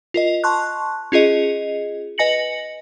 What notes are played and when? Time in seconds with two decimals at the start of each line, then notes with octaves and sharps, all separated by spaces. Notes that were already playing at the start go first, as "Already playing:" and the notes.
0.14 F4 A#4 D#5
0.44 A5 C6 C#6 F#6
1.12 C#4 F4 G#4 D#5
2.18 B4 D#5 G#5 A#6 C#7 F#7